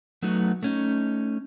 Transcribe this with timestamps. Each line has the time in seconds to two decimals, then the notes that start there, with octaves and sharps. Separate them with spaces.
0.22 F#3 A3 B3 D#4 F#4
0.63 A3 C#4 D#4